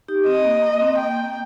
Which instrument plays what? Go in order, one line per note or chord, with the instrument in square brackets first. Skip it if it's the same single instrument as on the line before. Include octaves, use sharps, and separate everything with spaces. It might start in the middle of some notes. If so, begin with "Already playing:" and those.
[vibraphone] D#4 G4
[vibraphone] C4 [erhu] D#5
[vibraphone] A#3
A#3
C4
[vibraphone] A#3 [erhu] G5